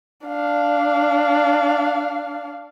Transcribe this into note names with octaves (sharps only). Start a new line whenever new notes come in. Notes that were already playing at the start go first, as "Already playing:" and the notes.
D4 F5